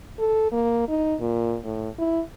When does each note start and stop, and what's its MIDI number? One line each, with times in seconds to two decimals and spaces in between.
0.19 0.51 69
0.52 0.87 58
0.89 1.15 63
1.20 1.57 46
1.65 1.89 45
1.98 2.21 64